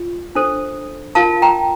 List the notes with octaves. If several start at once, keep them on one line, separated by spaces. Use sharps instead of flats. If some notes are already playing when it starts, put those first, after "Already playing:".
Already playing: F4
D4 A4 C5
F4 A#4 F5 A5
G5 A#5